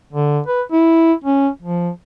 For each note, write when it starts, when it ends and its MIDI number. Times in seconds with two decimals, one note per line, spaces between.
0.13 0.40 50
0.47 0.62 71
0.72 1.13 64
1.24 1.48 61
1.62 1.90 53